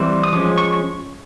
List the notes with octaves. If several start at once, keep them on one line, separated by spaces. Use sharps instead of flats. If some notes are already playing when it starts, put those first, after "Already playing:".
Already playing: E3 G3 C4
D#6
F3 G#3 C#4 D6
C#6